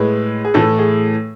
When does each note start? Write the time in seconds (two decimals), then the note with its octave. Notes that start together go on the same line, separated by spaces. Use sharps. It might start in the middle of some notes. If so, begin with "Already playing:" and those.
Already playing: A2 G#3 B4
0.45 G#4
0.54 A2 E3 A3 A4
0.79 G#4